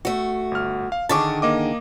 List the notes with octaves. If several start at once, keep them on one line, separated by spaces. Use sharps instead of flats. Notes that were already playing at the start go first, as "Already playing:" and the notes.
A3 F#4
G1 F6
F5
D3 D#3 G#4 A5 C#6 D6
A#3 D#5 D6